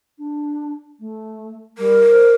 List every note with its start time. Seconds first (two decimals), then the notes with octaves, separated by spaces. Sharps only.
0.18 D4
0.99 A3
1.78 G3 A#4
2.09 C5